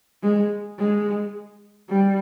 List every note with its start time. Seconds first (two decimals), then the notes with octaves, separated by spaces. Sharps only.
0.23 G#3
0.78 G#3
1.89 G3